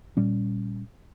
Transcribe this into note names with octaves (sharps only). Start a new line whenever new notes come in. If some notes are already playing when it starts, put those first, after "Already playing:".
A#2 G3 C#4